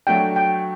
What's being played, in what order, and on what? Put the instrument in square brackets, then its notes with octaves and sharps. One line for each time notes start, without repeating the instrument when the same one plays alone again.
[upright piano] F#3 A3 D4 F#4 [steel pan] G5
[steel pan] G5